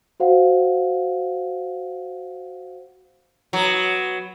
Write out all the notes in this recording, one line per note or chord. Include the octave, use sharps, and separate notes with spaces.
F#4 C5 F5 F#5
F#3 B3